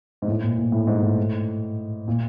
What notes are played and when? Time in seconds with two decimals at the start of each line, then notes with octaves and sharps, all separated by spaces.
0.22 G#2
0.28 A2
0.43 A#2
0.58 A#2
0.72 A2
0.87 G#2
1.03 A2
2.08 A#2